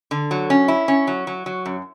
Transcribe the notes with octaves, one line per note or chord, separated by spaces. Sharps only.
D3
F#3
C#4
E4
C#4
F#3
F#3
F#3
F#2